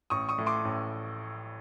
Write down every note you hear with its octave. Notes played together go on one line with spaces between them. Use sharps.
A1 C#6 D#6
C#6 D#6
A2
C6 D6
A1